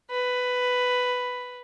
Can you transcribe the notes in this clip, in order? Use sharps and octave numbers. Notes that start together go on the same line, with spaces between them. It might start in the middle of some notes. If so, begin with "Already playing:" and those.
B4